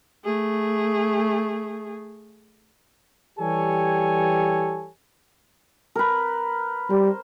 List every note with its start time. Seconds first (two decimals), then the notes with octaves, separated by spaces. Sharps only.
0.25 A3 G#4
3.39 E3 G3 G4 A4 C#5 G#5
5.95 A#4 B4
6.90 G3 C5